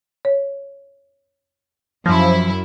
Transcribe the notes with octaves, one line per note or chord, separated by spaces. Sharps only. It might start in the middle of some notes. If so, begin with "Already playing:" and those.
C#5
F#2 F3 E4 A#6